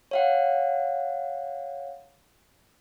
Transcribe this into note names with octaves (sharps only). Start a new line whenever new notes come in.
C#5 F5 F#5